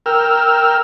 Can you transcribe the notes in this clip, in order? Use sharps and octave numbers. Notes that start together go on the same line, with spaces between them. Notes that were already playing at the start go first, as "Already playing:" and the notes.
A#4 G5 E6 F6